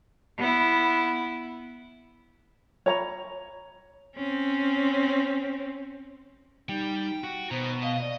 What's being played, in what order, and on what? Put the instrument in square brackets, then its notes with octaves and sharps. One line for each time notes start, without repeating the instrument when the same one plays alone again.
[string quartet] B3 E4
[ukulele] C#5 A#5
[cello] C4 C#4
[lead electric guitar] G3 [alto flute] D#4 [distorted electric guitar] G5
[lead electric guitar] F#4
[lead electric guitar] B2 [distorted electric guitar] D#3 A#5 [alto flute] C5
[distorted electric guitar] D#5 [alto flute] F5
[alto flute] D5